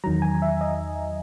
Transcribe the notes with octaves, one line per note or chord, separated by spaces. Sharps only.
E2 D#3 F#3 A#5
G#5
E5
D#5